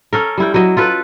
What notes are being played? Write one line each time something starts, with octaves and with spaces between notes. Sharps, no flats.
C#4 A4 A#4
G3 E4 G5
F#3 E4 D#5
F4 A4 B4